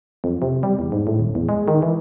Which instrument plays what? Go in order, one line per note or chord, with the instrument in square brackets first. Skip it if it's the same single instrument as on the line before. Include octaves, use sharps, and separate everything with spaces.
[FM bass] F2
C3
G3
E2
G#2
A2
D#1
E2
G#3
D#3
E3